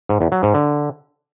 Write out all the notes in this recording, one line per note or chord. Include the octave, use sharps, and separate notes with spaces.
G#2
E2
F#3
G#2
D3